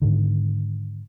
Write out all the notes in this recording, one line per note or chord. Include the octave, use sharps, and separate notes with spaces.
G#2 D3 D#3